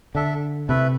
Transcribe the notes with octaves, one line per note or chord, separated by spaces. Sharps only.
D3 D4 A4 E5
C3 A3 E4 B4 E5